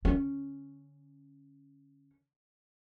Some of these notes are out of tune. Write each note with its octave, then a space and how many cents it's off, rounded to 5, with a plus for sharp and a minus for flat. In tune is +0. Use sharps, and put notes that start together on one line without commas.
D3 -20 C#4 +0